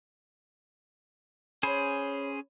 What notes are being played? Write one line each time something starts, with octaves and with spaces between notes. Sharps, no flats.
C#4 G#4 C5 C#5 B5